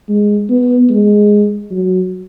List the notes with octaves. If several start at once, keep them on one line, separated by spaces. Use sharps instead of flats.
G#3
B3
G#3
F#3